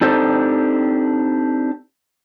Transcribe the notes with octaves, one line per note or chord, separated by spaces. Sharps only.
C4 D4 D#4 G4 A4 C5